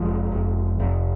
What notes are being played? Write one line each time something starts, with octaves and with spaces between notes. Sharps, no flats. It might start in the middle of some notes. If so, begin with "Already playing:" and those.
Already playing: F1 F3 G#3
F1
F1